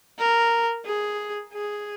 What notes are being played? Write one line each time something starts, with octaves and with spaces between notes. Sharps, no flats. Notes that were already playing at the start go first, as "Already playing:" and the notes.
A#4
G#4
G#4